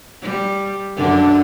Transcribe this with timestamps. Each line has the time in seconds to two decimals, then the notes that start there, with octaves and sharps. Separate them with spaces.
0.22 G3
0.96 F#2 D3 D4